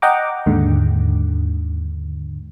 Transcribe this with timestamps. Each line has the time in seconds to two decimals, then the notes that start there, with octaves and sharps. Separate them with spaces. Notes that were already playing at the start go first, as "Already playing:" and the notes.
0.02 D#5 F#5 G5 A#5 D6
0.46 D#2 G#2 D3